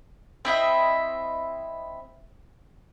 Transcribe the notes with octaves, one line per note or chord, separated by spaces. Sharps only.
C4 E4 D#5 E5